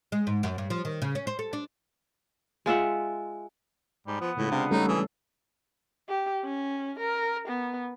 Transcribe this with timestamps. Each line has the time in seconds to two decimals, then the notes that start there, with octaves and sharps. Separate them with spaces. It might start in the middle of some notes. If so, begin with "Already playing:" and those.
0.12 G#3
0.27 G#2
0.43 F#2
0.58 G2
0.70 F3
0.85 D#3
1.02 C#3
1.15 C#4
1.27 C5
1.39 A4
1.53 D4
2.66 G#3 F4 E5 F#5
4.07 G#2 G3
4.21 F3 B3
4.37 A2 C#3 G#3 F4
4.51 C3 D4 F5
4.71 G3 A3 C#4 D#4 A4 C#5
4.88 E3 G#4
6.08 G4
6.44 C#4
6.99 A#4
7.48 B3